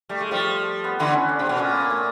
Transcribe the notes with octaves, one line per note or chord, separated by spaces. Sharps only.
G3 A3
G#3
F3 G3
B3
D3 E3 B3
C#4
D4
C3
B2
A#2 C#4
A#3
A#3
A3